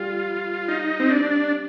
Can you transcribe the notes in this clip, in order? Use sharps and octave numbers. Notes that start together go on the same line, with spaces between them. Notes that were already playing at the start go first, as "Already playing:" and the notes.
Already playing: G3 F4
D#4
C4
D4